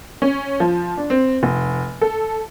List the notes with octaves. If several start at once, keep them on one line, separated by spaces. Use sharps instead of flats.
C#4
F3
D4
C4
F1
A4